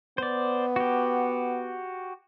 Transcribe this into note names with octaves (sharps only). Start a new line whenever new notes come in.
B3 C5 D5
F#4 G4